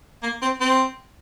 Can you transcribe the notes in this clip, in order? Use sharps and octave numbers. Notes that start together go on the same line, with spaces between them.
A#3
C4
C4